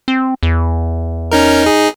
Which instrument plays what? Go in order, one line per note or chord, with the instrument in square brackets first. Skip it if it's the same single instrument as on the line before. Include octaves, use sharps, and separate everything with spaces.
[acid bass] C4
E2
[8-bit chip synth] C#4 D#4 A#4
D#4 G#4